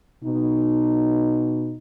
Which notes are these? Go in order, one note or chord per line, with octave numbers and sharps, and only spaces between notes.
B2 D#4